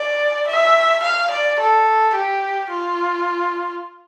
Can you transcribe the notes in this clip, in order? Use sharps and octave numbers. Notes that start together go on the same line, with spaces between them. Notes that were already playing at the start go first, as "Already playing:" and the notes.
Already playing: D5
E5
F5
D5
A4
G4
F4